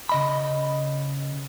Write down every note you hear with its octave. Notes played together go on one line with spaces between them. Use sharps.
C#3 D#5 B5